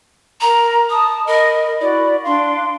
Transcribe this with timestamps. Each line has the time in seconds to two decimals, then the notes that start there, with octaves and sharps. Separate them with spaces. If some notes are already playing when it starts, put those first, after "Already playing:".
0.41 A#4 A#5
0.90 A5 D#6
1.27 A#4 D#5 B5
1.81 E4 F#4 D5 B5
2.24 D4 F5 C6